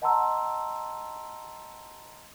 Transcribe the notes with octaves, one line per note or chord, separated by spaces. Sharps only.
D#5 F#5 A5 A#5 C6 E6